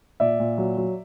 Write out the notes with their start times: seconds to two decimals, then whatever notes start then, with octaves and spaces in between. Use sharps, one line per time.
0.20 A#2 D5 E5
0.40 A#2
0.58 F#3
0.77 F#3